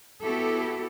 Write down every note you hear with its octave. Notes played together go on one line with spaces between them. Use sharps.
B3 E4 F#4 G4 A4